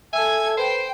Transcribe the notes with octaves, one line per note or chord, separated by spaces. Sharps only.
A4 E5 G#5 G#6
B4 C5 G5